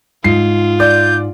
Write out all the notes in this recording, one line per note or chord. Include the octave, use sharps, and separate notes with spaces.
G#2 F4 C7
D5 G6